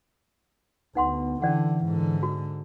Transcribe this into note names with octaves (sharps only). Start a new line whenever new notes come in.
D2 B3 D#4 F#5 C6
D3 E3 C#4 D5 F#5
G#2 D3
F#4